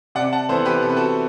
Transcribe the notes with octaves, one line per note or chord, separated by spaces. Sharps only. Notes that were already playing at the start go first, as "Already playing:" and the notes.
C3 D5 F#5
F#5 A5
E3 B3 A4 C5
G4 B4
C3 A4
B4
F#4 A4